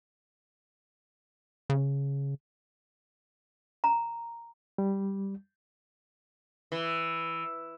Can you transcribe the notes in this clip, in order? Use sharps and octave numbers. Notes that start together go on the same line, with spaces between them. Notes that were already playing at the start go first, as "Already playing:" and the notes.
C#3
A#5
G3
E3